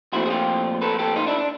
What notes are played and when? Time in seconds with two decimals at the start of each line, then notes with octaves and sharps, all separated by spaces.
0.12 A#2 F3 A3 C4 E4 F#4
0.26 G#4
0.30 F4 G4
0.82 A4 B4
0.99 G4 A4
1.16 D#4 F4
1.27 D4 E4
1.38 D4